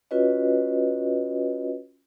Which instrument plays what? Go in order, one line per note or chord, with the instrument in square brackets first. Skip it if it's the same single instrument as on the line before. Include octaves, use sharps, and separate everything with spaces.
[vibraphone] C#4 F4 F#4 B4 C#5 D#5